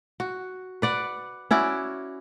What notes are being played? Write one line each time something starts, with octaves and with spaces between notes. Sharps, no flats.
F#4
B4 D5 F#5
C#4 E4 F#4 D5